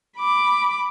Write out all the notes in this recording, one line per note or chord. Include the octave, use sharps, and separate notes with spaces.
B5 D6